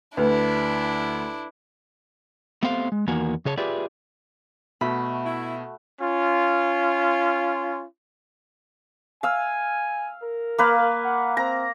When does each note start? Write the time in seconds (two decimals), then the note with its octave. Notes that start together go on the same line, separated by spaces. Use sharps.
0.17 D2 D4 E4 B4
2.63 A3 B3 C4 G4 C5 F5
2.92 G#3
3.08 E2 D#3 A#3 F#4 G#5
3.45 C#3 G#4 C#5 A5
3.57 F4 G4 G#4 B4 D5 E5
4.81 B2 A3 F#4 B5
5.25 E4
6.01 C#4 F4
9.23 F5 G#5 E6
10.22 A#4
10.58 A#3 B4 F5
11.05 F#5
11.37 C4 A#5